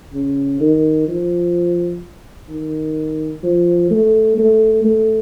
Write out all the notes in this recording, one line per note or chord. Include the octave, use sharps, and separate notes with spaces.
C#3
D#3
F3
D#3
F3
A3
A3
A3